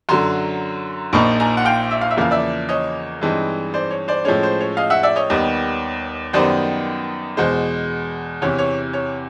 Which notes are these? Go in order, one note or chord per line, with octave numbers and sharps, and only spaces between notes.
F#2 D3 F#3 A#5 C6
A#1 A#2 F3 A#3 D#4 B5 C#6
G#5 A#5
F#5
F5 G5
E5
F5
E5
E2 C#3 F3 A#3 F5
D5 E5
C#5 D#5
G2 E3 G#3 C4 D#4
C5 D5
C#5
C5 D5
A2 F3 G#3 C#4 C#5
C5
C#5
D#5 F5
E5 F#5
D5 E5
C#5 D#5
D#2 D#3 G3 B3
F#2 D#3 G3 B3 D#4 C5 D5
E2 B2 G#3 C5
E2 C3 E3 C#5
C#5
C#5